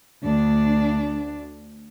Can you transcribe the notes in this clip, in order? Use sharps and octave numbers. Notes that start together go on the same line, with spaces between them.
D2 D4